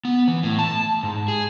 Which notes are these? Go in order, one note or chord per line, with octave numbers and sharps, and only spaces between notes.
B3
E3
A2
A5
G#2
G#4